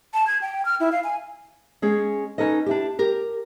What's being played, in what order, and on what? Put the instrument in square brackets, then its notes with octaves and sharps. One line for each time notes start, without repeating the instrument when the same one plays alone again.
[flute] A5
G#6
G5
F6
E4
F5
G#5
[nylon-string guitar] G#3 C#4 G#4
C#4 D#4 A4 B4 D#5
D4 E4 G4
G4 A#4